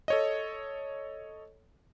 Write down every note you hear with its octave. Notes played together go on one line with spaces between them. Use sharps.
A4 C#5 D#5